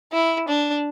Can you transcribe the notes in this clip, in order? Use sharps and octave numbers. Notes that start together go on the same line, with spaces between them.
E4
D4